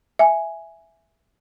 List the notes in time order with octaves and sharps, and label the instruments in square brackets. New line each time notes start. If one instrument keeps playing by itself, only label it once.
[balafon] E5 G#5